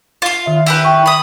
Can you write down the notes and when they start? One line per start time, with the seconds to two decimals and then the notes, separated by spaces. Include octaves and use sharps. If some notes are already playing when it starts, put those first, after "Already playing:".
0.22 F4 F5
0.46 D#3 E5
0.66 E4 G4 B4
0.85 G5 C#6
1.06 B5 D#6